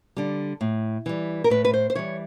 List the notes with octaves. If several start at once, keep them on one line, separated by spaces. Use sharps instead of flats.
D3 G3
A2
E3 G3
A#4
A2 B4
B4
C5
C5
E3 G3 C#5